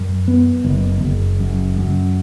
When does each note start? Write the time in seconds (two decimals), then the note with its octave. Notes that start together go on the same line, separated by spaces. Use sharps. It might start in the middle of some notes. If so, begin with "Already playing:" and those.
Already playing: F#2
0.28 B3
0.64 F#1
1.03 F#1
1.40 F#2
1.78 F#2